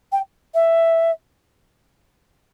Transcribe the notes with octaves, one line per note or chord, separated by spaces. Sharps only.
G5
E5